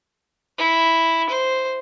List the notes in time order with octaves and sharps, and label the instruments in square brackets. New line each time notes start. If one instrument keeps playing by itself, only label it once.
[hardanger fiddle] E4
C5